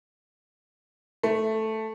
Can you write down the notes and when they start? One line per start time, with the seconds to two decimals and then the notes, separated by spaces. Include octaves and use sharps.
1.23 A3